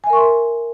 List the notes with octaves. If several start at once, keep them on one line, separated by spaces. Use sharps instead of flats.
A#4 E5 G#5 C6 C#6